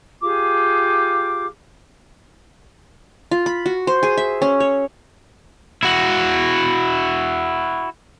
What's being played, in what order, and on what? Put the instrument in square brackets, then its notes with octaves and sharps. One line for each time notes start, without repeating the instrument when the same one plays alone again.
[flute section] F4 G4 G#4 D6
[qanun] F4
B5
F#4
C5
G#4
E5
C#4
C#5
[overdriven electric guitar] E4 F#4